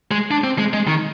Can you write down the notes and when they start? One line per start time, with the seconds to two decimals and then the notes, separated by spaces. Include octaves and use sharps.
0.11 G#3
0.31 D4
0.44 C4
0.58 G#3
0.73 G#3
0.88 D#3